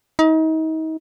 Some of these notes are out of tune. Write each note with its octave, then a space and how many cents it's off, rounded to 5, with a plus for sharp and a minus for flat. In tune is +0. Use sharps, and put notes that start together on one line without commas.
D#4 +35